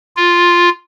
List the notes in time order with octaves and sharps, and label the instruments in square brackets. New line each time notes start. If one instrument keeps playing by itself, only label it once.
[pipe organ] F4